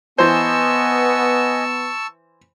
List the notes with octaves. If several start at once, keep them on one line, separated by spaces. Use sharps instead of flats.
E3 B3 C5 D#5 G#5 A5 C#6 E6